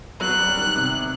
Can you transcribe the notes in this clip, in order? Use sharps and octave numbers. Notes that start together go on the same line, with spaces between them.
F#3 F#6
G3
D#3
C3